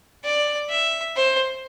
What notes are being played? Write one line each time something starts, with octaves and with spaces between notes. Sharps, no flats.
D5
E5
C5